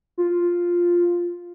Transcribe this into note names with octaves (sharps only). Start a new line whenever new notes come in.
F4